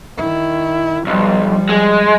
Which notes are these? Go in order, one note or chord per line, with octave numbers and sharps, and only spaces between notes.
D#3 E4
B1 F3 G3
G#3